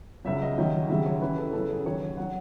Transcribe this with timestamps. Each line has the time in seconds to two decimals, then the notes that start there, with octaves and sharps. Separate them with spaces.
0.25 C#2 C#3 F#3 E5
0.42 D#5
0.58 D#2 D#3 F#3
0.89 D#2 C#3 F#3 E5
1.06 C#5
1.21 F#2 E3 B4
1.37 A4
1.53 F#2 C#3 F#3 A4
1.70 G#4
1.85 D#2 D#3 F#3 C#5
2.17 F#3 F#5